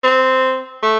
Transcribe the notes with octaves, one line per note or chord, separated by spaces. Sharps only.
C4
A3